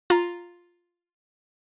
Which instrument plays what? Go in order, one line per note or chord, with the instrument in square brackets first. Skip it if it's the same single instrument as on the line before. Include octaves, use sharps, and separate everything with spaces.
[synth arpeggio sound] F4 A#5